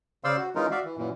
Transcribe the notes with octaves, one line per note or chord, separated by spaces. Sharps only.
C#3 C5 D5 F5 C6 E6
F#4
E3 G#3 C#4 D#4 F4 A#4
F#4 D5 E5 F5
E3
F#2 A#2 E3